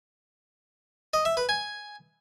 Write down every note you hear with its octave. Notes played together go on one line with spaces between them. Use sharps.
D#5
E5
B4
G#5